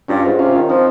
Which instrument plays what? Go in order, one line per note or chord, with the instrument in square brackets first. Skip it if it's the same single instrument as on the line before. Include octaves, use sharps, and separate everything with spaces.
[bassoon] G2 [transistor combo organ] C#4 F4
[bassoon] G#2
[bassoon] C3 [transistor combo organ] C#4 F4
[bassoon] D#3
[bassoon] F3 [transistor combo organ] C4 D#4